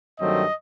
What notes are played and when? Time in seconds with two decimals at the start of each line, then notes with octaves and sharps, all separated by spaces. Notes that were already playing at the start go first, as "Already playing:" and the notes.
0.20 G2 D#3 F#3 A3 C4 D#5